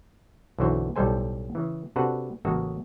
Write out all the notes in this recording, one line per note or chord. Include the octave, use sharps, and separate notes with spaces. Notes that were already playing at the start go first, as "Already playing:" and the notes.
B1 F#2 D3 E3 F#4 C5
B1 A2 G3 A4 C5 G#5
C#3 E3
C3 D4 F#4 A4 B4 F#5
A1 C#3 G#3 A#3 F#4 A4